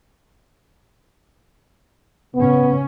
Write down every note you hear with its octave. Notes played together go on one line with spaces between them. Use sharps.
C#3 B3 C#4